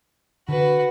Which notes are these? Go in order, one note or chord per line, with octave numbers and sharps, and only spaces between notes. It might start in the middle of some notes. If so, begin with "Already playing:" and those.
D3 F#4 B4